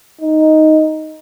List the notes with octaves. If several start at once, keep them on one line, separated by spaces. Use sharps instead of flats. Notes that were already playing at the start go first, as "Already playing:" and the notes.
D#4